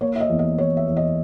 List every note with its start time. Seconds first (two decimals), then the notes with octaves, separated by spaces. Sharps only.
0.01 A#3 C#5
0.16 E5
0.20 D#5
0.30 E2
0.39 D#5
0.58 E2 C#5
0.77 E5
0.87 E2
0.97 D#5